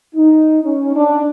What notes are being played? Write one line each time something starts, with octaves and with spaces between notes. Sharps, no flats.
D#4
C#4
D4